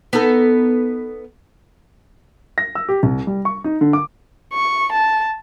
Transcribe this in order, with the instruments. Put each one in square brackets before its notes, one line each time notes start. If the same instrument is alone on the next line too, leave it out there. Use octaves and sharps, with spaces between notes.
[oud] B3 D#4 A4
[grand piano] A#6
E6
G4
C2
G3
C#6
D#4
D3
D6
[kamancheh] C#6
A5